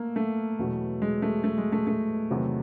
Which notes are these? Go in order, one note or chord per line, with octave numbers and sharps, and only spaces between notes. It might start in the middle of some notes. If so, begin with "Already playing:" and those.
Already playing: A3 A#3
A3
E2 B2 F#3
G#3
A3
A3
G#3
A3
A3
E2 C3 D#3 F#3